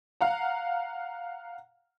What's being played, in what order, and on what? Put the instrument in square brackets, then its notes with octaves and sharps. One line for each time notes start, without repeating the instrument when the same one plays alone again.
[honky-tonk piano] F5 F#5 A#5